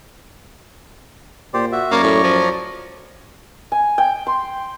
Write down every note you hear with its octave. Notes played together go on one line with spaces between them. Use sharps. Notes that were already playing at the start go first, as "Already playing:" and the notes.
A#2 G4 C5 D5
F#4 E5
F#2 A#3 C#5 D5 A#5
A2
F3
G#5
G5
C6